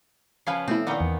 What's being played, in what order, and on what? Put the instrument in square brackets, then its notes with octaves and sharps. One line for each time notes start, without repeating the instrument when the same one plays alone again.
[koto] C#3 F3 B4 [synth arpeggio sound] F5 G#6 C7
[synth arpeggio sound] B2 A3 E4 [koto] C4
[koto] A#2 D#3 B3 [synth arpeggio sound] D5 F5
[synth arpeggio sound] E2